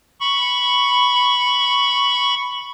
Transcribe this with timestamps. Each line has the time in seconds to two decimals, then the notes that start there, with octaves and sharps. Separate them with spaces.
0.20 B5 C#6